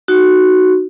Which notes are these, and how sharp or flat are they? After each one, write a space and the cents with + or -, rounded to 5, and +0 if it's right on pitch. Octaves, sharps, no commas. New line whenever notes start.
D#4 -15 F#4 +0